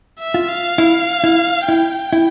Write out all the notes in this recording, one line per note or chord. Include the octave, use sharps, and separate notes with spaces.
E5
F4
F5
E4
E4
E4 G5
E4